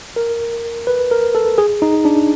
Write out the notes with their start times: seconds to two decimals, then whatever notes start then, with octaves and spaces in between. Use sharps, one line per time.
0.16 A#4
0.87 B4
1.11 A#4
1.35 A4
1.58 G#4
1.82 D#4
2.05 D4